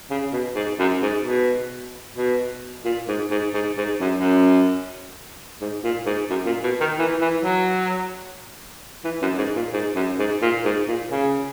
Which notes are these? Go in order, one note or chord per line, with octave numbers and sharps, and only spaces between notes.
C#3
B2
G#2
F#2
G#2
B2
B2
A#2
G#2
G#2
G#2
G#2
F#2
F#2
G#2
A#2
G#2
F#2
A#2
B2
D#3
E3
E3
F#3
E3
F#2
G#2
A#2
G#2
F#2
G#2
A#2
G#2
A#2
C#3